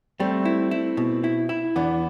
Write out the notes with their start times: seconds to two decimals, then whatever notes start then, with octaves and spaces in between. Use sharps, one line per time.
0.20 G3 A3 C4
0.45 E4
0.71 E4
0.97 B2
1.24 E4
1.49 E4
1.76 E2 B3 D4